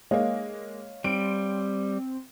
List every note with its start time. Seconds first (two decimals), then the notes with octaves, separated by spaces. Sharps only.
0.11 G#3 A#3 C#5 D#5 F5
1.04 G3 C4 D7